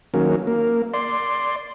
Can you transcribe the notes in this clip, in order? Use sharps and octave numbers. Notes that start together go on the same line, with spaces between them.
D#3 F#3 A#3 C#4
A#3
D5 C6